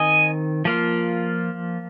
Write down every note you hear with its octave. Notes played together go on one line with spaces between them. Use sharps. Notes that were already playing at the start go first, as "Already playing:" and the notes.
Already playing: D#3 C4 D#5 G#5
F3 A#3 F4